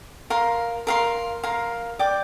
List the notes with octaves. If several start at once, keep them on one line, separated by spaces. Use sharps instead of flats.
A#4 F5 C6
A#4 F5 C6
A#4 F5 C6
D5 G5 D6